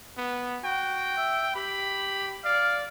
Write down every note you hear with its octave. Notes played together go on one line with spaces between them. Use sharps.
B3
F#4 G5
E5
G4 B5
D5 F5